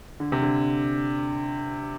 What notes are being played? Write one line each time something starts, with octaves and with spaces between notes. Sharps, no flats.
D3
C3
D3